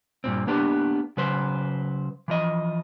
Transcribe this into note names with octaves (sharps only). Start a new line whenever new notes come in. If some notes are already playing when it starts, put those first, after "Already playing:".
G2 A#2 C4
A#3 B3 D4 G4 B4
C#3 F#3 B4 C5
E3 F3 D#5